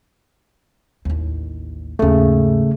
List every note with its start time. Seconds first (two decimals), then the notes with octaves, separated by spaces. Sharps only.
1.05 A1 D#2
1.99 D#2 G#2 C#3 A3